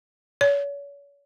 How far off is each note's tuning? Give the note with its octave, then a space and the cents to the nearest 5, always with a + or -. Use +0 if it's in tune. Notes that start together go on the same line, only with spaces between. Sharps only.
C#5 +40